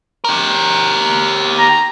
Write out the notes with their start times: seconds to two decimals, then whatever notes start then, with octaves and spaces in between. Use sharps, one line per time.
0.24 G4 A#4
1.58 A#5